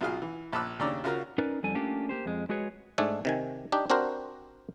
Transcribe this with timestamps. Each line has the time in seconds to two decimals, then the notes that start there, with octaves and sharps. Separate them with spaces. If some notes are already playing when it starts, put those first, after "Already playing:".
0.01 B1 B2 F4 G#4 F5 F6
0.22 E3
0.52 A#1 A5 B5 D6 E6 F#6
0.79 D#2 C#3 D4 D5 A#5 E6
1.04 C#3 F4 F#4 A#4 A#5 F6
1.38 C#4 D#4 A#4 B4 D5
1.63 F2 D3 G3 A4 G#5
1.75 A3 A#3 C#4 D4 F4 G4
2.09 A#3 G4 C5
2.26 F2 G#3
2.49 G#3 F#4 G#4 B4 C#5
2.98 G#2 A3 D4 A4 G#5
3.25 C3 D#3 G#5
3.72 D4 D#4 G4
3.90 C4 D4 F#4 A#4 C5